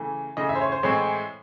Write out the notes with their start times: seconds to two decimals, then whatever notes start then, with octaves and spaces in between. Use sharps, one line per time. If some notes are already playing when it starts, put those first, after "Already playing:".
Already playing: C#3 E3 A3
0.37 C#3 E3 A3 D#5
0.49 E5
0.55 C5
0.61 C#5
0.72 C5
0.83 A2 E3 G#3 C4 C#5